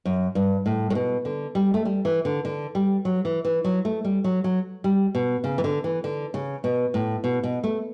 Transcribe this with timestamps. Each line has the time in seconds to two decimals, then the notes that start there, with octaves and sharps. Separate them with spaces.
0.05 F#2
0.35 G2
0.66 A2
0.90 A2
0.95 B2
1.25 D3
1.55 G3
1.74 A3
1.85 G3
2.05 E3
2.25 D3
2.45 D3
2.75 G3
3.05 F#3
3.25 E3
3.45 E3
3.64 F#3
3.85 A3
4.04 G3
4.24 F#3
4.44 F#3
4.84 G3
5.15 B2
5.44 C#3
5.58 E3
5.64 D3
5.84 E3
6.04 D3
6.34 C#3
6.64 B2
6.94 A2
7.24 B2
7.44 B2
7.64 A3